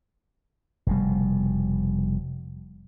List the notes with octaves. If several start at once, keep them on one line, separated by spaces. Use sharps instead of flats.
F1 B2 G3